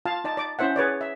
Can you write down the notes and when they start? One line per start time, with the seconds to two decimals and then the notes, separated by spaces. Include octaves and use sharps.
0.05 F4 F5 A5
0.24 D#4 D5 A5
0.37 D5 D6
0.59 C#4 E4 C5 E5 F#5
0.76 G#4 B4 C#5 D5
1.01 E5